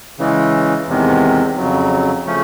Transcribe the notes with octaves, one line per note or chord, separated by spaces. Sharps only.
C#3 E3 G#3
E2 C3 D#3 G#3
F2 C#3 F#3
C#3 F3 A3 C#4